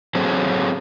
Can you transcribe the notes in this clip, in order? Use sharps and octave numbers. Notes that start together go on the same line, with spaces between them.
F#3 C4 G#4 A4 C5 C#5